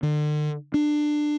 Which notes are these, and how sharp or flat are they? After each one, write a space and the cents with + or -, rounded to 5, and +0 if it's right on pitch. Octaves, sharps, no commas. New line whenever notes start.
D3 +40
D4 +20